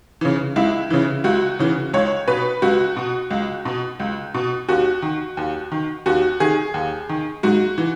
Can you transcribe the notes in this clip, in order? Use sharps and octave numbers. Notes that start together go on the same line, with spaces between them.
C#3 E3
C#2 E4
C#3 E3
C#2 F#4
C#3 E3
C#2 C#5
B2 B4
C#2 F#4
B2
C#2
B2
C#2
B2
D#2 F#4
D#3
D#2
D#3
D#2 F#4
D#3 G#4
D#2
D#3
G#2 F#4
E3